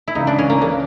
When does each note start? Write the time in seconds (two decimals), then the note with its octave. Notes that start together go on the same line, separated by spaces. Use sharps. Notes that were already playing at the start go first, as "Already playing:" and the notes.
0.08 E4
0.15 C#2 C#3 E3 D#4
0.27 D4
0.39 C#4
0.50 A#3
0.61 C#3 E3 A#3